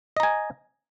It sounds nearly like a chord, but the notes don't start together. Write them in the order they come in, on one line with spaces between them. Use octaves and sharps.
D#5 A#5 G#5